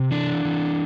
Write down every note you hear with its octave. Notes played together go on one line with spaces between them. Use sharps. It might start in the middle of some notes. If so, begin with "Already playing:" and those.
Already playing: C3
E3 D4
E3